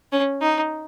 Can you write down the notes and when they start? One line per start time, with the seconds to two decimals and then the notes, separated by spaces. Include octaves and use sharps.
0.12 C#4
0.41 D#4